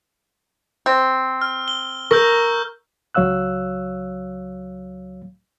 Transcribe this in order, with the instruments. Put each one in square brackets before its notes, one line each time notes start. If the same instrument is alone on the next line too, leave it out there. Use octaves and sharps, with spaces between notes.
[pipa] C4
[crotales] F6
G7
[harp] A#4 [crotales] C#6 E6 G6
[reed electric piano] C#2 F#3 C#5 F5 E6 F#6